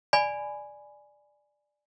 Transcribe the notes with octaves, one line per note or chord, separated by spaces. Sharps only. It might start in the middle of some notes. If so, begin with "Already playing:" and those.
D5 G#5 B5